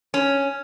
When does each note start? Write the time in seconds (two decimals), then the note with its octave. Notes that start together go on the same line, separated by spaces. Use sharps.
0.14 C#4